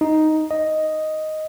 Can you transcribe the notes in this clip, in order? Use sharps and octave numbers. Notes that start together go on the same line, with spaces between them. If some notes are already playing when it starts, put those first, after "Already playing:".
D#4
D#5